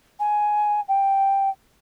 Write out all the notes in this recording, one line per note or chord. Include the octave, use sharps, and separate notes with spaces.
G#5
G5